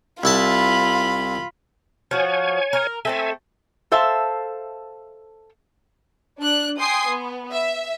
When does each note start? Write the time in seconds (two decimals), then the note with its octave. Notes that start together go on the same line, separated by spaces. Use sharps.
0.24 C2 E4 F4 A5 B5
2.11 F3 F#4 C#5 G#5
2.73 A#4
3.05 A3 C4 A4 E5 G#5
3.92 A4 C5 E5 F5 A5
6.41 D4 F#6
6.80 G5 G#5 C6 D#6 C7
7.10 B3
7.53 E5